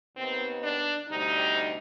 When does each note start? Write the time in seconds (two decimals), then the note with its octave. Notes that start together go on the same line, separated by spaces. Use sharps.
0.17 D#2 D#3 B3 C4
0.63 D4
1.08 D2 C3 G3 D#4